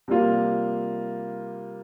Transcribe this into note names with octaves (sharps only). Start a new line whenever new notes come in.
C3 G3 A#3 F4